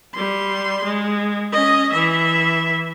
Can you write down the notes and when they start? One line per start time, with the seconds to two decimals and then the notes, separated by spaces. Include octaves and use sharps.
0.15 G3 C6
0.84 G#3
1.52 C#4 D#5
1.93 E3 E5